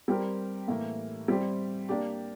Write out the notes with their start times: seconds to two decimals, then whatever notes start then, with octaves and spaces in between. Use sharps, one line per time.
0.08 G3 C4 G4 A#4
0.68 A2 E3 A#3
1.28 G3 C4 G4
1.89 A#3 D4 G4 D5